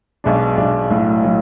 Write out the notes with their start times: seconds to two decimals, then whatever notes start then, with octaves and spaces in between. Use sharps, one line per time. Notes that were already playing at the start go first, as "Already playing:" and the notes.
0.24 B1 B2 G#3 D4
0.57 B1 B2 G#3 D4
0.90 B1 A2 F#3
1.23 A2 F#3